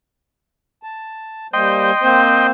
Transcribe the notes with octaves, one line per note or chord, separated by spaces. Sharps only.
A5
G3 A#3 C5 D#5 G5 C6
A#3 C4 C5